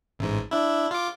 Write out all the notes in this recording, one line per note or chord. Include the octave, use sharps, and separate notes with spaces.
A1 G#2
D4 E4
F4 D6